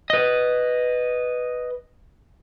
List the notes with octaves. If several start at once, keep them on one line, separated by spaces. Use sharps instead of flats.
B4 D#5